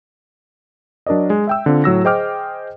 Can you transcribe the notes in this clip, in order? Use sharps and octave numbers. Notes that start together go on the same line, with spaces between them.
F#3 D4 A#4 D5 D#5
G#3
E5 G5 E6
D3 C4 F4
A2 F#3 E6 A#6
G#4 C5 D#5 G5 D6 F6